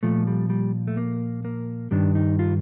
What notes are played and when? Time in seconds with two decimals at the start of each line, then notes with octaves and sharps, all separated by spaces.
0.03 A#2 F3 A3
0.27 G3
0.50 G3
0.87 A3
0.97 A#3
1.45 A#3
1.91 G2 D#3 G3 D4
2.15 D#4
2.39 F4